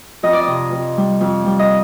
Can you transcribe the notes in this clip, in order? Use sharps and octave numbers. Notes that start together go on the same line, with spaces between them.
F2 D#5
D5
C3 D#5
F2
G3
F2
G3
D#5